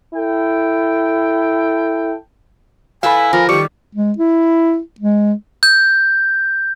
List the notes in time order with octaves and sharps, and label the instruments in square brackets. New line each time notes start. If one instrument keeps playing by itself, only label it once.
[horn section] E4 A4 G5
[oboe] E4 [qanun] A4 B4 E5 [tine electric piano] F5 B5 [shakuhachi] G#5
[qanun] F3 [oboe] A#4
[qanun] D#3 G3 [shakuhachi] G4 [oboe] C#6 [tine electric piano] D6
[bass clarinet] G#3
E4
G#3
[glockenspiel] G6